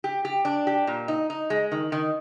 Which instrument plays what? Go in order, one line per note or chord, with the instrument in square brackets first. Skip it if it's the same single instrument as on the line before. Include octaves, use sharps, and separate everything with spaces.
[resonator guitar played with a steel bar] G4
G4
D4
G4
A#2
D#4
D#4
G#3
D#3
D#3